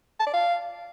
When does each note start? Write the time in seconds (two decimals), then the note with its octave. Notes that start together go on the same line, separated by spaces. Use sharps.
0.19 A5
0.26 D5
0.33 F5